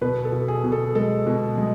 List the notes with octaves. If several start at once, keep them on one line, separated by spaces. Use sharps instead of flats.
B2 B4
A4
B2
G#4
B2
A4
G#3 A4
B2
G#3